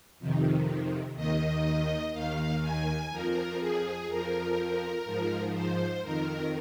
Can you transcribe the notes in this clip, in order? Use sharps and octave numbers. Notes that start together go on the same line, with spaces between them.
F2 C3 D#3
D#2 D#3 D#5
D#2 D#3 F5
G#5
F2 F3 A#4
G#4
F2 F3 A#4
G#2 F3
C5
F2 D#3 A#4